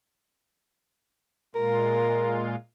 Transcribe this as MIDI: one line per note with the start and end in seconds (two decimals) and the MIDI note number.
1.55 2.56 46
1.55 2.56 56
1.55 2.56 65
1.55 2.42 70